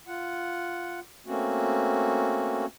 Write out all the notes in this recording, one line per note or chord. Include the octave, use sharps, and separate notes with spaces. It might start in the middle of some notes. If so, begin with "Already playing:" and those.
F4 F#5
A3 A#3 C4 C#4 F#4